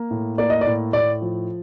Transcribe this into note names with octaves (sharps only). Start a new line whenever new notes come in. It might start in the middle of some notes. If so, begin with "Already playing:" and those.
Already playing: A#3
A2
A#3 D5
D#5
D5
A2
A2 D5
F3